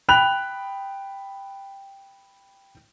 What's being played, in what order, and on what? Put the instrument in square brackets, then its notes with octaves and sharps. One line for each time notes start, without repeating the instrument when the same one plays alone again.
[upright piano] G5 B5 F#6 F7